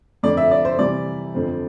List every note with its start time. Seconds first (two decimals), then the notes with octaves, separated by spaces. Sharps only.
0.23 F2 D3 F3 D5
0.37 E5
0.51 D5
0.65 C5
0.78 C3 E3 G3 D5
1.34 F2 D3 F3 C4